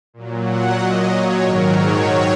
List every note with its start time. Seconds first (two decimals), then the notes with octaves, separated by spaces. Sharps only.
0.14 A#2 F#3
0.46 F#5
0.79 D#5
1.11 C#5
1.43 G#2 D#3 F#3 A#4
1.75 C#5